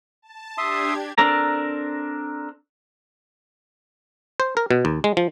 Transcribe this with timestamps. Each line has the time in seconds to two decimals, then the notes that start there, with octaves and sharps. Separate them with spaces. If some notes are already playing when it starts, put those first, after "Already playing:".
0.22 A5
0.58 D4 G4 E5 C6 D#6 G#6
1.18 C4 D4 A4 A#4 A#5
4.40 C5
4.57 A#4
4.71 B2
4.85 D#2
5.04 G#3
5.17 F3